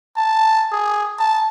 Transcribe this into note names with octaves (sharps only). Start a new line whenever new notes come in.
A5
G#4
A5